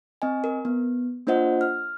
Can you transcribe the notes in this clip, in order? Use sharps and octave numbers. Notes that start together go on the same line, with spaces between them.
C4 D#5 G#5
A#4
B3
A#3 D4 F4 C5 D#5 F#5
F6